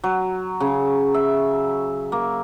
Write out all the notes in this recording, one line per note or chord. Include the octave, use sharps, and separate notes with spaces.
F#3
C#3
E5
A#3